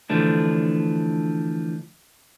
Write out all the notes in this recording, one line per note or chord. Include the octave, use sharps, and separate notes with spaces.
D3 E3 F3 A3 D4